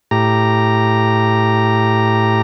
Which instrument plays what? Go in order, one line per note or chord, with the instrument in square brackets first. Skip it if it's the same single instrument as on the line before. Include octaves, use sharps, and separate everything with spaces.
[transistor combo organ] A2 G4 A#5